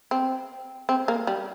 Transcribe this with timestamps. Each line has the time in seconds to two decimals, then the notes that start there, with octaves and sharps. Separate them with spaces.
0.11 C4
0.89 C4
1.08 A#3
1.27 G3